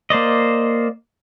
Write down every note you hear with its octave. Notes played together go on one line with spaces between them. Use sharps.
A#3 C5 D5 D#5